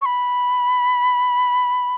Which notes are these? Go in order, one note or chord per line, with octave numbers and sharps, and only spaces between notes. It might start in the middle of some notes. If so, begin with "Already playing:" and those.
C#6
B5